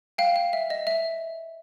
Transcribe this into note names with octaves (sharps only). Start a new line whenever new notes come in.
F5 G5
F5
E5
D#5
E5